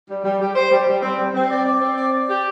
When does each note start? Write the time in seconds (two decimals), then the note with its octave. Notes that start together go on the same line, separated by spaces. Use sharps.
0.08 G3
0.24 G3
0.40 G4
0.55 C5
0.71 G3
0.87 G3
1.03 C4
1.18 G3
1.34 C4
1.50 D5
1.65 D5
1.81 C4
1.97 D5
2.13 D5
2.29 G4